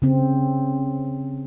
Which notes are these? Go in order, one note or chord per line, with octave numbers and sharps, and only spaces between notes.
C#3 C4